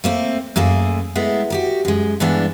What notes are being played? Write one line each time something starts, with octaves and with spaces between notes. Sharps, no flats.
A3 A#3 C4
F#2 A3 A#3 G#4
G#3 A3 B3 E4
F#4 G4 A#4
F#2 G#3
G2 E3 G#3 B3 D4